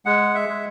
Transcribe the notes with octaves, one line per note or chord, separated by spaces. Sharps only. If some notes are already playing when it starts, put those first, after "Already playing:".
G#3 F#5
E5
G#3